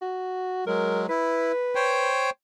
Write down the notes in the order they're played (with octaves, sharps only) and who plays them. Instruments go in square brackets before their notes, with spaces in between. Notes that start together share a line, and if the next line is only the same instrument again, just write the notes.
[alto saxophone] F#4
[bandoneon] F#3 G#3 [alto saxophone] A#4
[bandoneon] E4 [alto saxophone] B4
[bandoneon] C5 C#5 G5